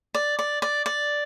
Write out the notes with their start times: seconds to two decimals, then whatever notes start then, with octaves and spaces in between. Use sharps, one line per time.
0.15 D5
0.39 D5
0.62 D5
0.86 D5